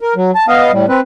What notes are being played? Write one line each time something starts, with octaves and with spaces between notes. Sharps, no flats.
A#4
F#3
A5
B3 D#5 F5
A2 G3
C4 B4